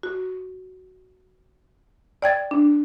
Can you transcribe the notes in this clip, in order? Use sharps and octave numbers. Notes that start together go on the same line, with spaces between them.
F#4
D5 G5 G#6 A6
D4